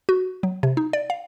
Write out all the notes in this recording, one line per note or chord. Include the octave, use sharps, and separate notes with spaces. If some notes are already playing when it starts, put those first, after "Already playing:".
F#4
F#3
C3
D#4
D5
F5